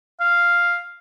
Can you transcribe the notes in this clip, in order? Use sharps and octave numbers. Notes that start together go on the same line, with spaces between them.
F5